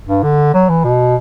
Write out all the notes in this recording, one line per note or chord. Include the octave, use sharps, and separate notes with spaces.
G2
D3
F#3
E3
B2